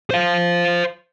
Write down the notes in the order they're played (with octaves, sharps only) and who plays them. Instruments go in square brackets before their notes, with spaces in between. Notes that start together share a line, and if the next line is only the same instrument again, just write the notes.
[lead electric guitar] C5 F5